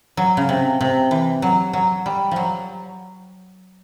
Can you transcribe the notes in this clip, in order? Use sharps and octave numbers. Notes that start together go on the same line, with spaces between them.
F#3
C#3
C3
C3
E3
F#3
F#3
G3
F3 F#3